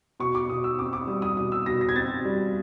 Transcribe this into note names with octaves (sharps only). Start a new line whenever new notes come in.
B2 C#6
D6
B2 D#6
E6
C4 D6
D6
G3 D#6
D#6
B2 D#6
E6
B2 A#6
A#6
G#6
C4 A6
G3